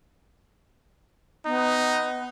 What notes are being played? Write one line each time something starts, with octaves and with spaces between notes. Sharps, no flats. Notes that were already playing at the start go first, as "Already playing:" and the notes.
B3 D#4